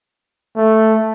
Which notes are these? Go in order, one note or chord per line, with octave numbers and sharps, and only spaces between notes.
A3